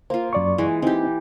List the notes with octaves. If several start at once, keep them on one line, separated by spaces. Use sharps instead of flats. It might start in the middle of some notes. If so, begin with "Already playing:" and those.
A#3 F4 C5
F#2 D5 C#6
E3 G#3
E3 C4 D#4 G4